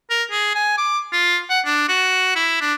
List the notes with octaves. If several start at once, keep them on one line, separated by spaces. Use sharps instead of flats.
A#4
G#4
G#5
D6
F4
F#5
D4
F#4
E4
D4